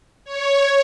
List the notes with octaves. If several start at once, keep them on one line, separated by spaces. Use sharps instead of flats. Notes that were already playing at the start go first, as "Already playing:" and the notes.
C#5